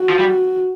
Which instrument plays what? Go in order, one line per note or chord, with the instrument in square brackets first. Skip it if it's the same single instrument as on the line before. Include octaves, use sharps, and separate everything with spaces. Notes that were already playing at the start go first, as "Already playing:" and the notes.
Already playing: [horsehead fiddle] F#4
[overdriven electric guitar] F3
G3